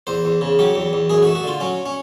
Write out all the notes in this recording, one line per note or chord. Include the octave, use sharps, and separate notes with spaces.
E2 C5
E2
C#3
F#3 G4
E2
E2
F#2 G#4
F#4
A3
F#4
D3 F4
F#3 C#4
C#4